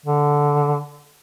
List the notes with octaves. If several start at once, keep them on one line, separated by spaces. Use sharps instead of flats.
D3